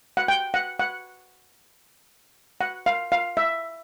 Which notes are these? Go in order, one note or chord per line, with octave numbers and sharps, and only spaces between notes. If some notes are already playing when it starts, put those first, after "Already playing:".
F#5
G5
F#5
F#5
F#5
F5
F5
E5